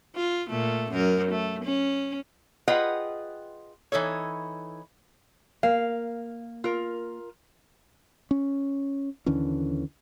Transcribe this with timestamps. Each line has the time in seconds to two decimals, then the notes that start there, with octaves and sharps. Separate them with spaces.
0.16 F4
0.50 A#2 A3
0.92 F#2 A#4
1.31 A3
1.64 C#4
2.68 F4 G#4 B4 D#5 F#5 G5
3.92 E3 D#4 A4 C#5
5.63 A#3 F5
6.64 F4 A#4
8.31 C#4
9.26 D#2 D3 E3 C#4